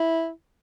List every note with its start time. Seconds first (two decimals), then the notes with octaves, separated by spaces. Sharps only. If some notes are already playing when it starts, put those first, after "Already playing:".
Already playing: E4